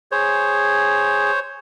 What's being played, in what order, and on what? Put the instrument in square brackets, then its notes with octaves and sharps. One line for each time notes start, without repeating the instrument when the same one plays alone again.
[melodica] G#4 [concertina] C5 C#5